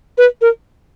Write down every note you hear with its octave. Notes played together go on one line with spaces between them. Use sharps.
B4
A#4